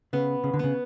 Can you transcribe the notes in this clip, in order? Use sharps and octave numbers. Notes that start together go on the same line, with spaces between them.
C#3 B3
C#3
D3
C#3 B3